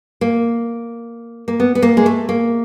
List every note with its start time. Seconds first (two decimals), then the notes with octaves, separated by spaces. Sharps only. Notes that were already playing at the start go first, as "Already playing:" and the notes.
0.21 A#3
1.48 A#3
1.60 B3
1.75 B3
1.82 A#3
1.97 G#3
2.06 A3
2.29 A#3